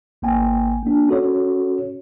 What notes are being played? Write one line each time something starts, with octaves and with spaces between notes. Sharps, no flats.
G#1 A#3 G5 G#5
A#3 D4
C#4 F#4 A4 C#5